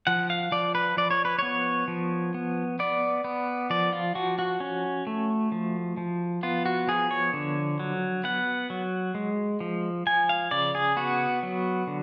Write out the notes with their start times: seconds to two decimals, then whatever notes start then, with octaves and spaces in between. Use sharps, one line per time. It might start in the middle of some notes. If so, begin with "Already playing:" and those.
0.07 F3 F#5
0.30 F5
0.52 F3 D5
0.75 B4
0.97 F3 D5
1.11 C#5
1.25 B4
1.39 B3 C#5
1.88 F3
2.34 B3
2.79 B3 D5
3.24 B3
3.70 F3 D5
3.93 F4
4.15 F3 F#4
4.39 F#4
4.60 C#4
5.07 A3
5.52 F3
5.97 F3
6.43 B3 F4
6.66 F#4
6.87 F3 G#4
7.11 C#5
7.33 D3
7.80 F#3
8.24 B3 F#5
8.70 F#3
9.15 G#3
9.60 F3
10.07 F3 G#5
10.29 F5
10.51 C#3 D5
10.75 G#4
10.96 B3 F#4
11.43 F#3
11.87 D3